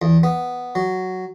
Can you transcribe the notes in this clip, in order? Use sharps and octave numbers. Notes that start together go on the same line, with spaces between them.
E2
B3
F#3